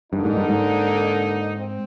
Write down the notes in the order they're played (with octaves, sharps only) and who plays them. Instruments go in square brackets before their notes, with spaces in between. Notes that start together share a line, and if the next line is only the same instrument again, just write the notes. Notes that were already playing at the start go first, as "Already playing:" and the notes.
[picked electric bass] G2 [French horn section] D3 G3 A#3 D#4
[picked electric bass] G#2
G2
G#2
[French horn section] C4